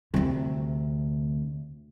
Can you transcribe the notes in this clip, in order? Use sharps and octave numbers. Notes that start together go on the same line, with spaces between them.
D2 C3